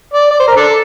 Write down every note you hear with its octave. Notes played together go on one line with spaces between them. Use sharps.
D5
D5
C5
A#4
D4 A4